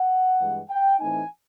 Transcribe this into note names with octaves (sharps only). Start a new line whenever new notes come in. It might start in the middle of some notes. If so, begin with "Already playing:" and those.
Already playing: F#5
G2 E3 G#3
G5
A2 E3 A3 C4 D#4 G#5